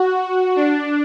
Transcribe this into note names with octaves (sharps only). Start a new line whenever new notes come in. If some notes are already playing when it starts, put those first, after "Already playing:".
Already playing: F#4
D4